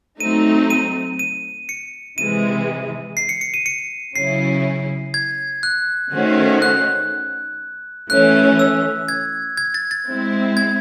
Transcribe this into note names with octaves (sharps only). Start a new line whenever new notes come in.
F#3 A3 C4 D#4 D#7
D#7
D#7
C#7
C3 E3 G#3 D#7
C7
C#7
C#7
D#7
C#7
C#3 F#3 C#4 E4 C7
G#6
F#6
D#3 A3 C#4 F#4 C5
F#6
E3 A3 C#4 F#6
E6
G#6
G#6
A6
A6
G#3 C4 E4
G#6